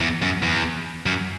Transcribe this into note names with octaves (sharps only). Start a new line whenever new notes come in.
E2
F#2
E2
F#2